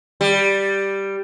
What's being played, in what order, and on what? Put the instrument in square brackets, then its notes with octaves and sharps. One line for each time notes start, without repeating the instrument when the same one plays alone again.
[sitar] G3